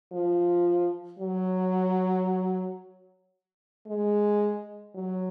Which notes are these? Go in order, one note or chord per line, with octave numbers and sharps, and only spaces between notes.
F3
F#3
G#3
F#3